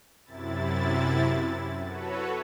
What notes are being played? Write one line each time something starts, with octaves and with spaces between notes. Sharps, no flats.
F#2 C3 E4 A6
F#4 A4 B4 C#5